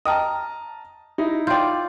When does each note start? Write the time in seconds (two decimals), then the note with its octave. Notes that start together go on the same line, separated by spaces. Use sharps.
0.05 D#5 G5 A5 A#5 D#6 F6
1.18 D#4 E4
1.47 F4 D5 G5 G6